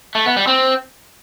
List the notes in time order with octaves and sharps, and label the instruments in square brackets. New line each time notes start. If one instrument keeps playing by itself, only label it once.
[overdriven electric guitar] A3
B3
G3
C4